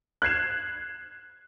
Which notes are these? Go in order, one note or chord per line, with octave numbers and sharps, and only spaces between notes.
F#6 G#6 C7 E7